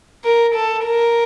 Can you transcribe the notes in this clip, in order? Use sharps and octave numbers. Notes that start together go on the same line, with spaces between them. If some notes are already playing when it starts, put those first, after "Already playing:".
A#4
A4
A#4